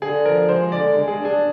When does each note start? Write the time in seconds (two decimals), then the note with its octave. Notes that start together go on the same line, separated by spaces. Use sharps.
0.01 D3 G#4
0.25 F3 A#4
0.49 G#3 C5
0.72 D3 D5
0.96 G#3
1.08 G#4
1.19 D4
1.25 G#4